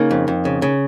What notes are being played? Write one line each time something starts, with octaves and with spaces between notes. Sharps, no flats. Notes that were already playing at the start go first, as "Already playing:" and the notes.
Already playing: C#3 A#3 D#4
F2
F2
C#3
C#3